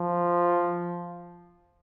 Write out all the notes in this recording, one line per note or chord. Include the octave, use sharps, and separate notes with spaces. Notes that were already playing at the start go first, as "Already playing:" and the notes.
Already playing: F3